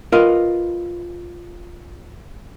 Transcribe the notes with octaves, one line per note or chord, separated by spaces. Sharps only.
F4 A#4 B4 D#5